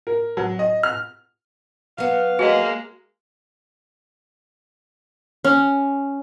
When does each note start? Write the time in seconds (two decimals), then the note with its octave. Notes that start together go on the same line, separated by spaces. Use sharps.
0.07 A#4
0.37 F#3
0.59 D#5
0.83 F6
1.98 F#3 B3 F5
2.39 G#3 A#3 F#4 D#5
5.44 C#4